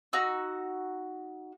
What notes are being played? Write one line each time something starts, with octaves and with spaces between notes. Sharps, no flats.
D#4 F#4 E6